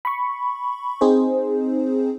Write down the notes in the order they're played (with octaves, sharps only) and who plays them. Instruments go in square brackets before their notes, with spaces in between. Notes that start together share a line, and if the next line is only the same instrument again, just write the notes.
[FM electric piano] B5 C#6
C4 D#4 G#4 C5